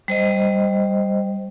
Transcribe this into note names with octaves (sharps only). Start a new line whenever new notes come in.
G3 C5 D#5